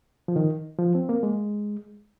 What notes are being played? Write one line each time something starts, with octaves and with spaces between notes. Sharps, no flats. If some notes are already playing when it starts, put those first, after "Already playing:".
F3
D#3
F3
C4
A#3
G#3